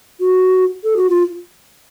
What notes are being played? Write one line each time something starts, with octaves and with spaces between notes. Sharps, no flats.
F#4
A4
F#4
F4